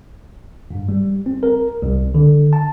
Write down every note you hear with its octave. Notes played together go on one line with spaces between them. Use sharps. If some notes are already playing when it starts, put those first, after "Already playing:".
G2
G3
C4
A#4
C2
D3
A5